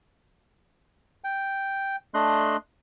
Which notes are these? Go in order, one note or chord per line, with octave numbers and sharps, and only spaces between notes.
G5
A3 D4 D#5 C6 F#6